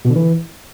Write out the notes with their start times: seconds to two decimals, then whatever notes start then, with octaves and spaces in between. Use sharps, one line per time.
0.05 B2
0.10 D3
0.16 E3